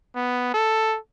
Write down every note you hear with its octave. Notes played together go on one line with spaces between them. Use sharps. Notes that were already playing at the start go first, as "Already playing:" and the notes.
B3
A4